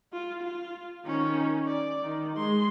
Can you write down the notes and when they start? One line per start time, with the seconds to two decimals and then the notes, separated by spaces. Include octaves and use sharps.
0.13 F4
0.44 F4
1.05 D#3 C#4
1.66 D5
2.03 D#3
2.37 G#3 C6